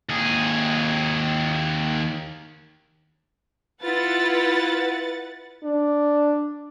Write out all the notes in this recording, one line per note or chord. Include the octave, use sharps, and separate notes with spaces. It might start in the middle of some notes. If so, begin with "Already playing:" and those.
D#2 G#4
E4 F4 B4 F#5 A6
D4